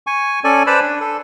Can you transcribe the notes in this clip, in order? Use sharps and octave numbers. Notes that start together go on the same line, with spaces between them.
G#5 C#6
C#4 A4 D5 G#5
B4 C5 D5 A5 B5
D4
A4